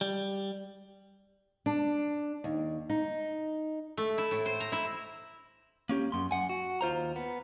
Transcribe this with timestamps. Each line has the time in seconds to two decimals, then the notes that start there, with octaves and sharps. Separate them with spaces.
0.01 G3
1.66 D4
2.44 D#2
2.90 D#4
3.97 A3
4.18 E4
4.31 A2
4.46 C5
4.60 A#5
4.72 E4
5.89 A#3 C#4 G4
6.12 F#2 C6
6.31 F#2 F#5 G#5
6.50 F#4
6.81 D#2 F4 C5 A#5
7.16 B3